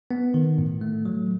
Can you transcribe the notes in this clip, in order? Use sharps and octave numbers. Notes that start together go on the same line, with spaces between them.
B3
D#3
A2
A3
F#3